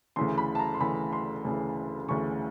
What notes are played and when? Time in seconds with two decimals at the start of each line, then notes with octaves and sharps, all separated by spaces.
0.16 D2 C#3 E3 C6
0.38 B5
0.55 A5
0.59 A#5
0.74 C6
0.80 D2 C#3 E3 B5
1.13 C6
1.45 D2 C#3 E3
2.08 D2 C#3 E3 C#6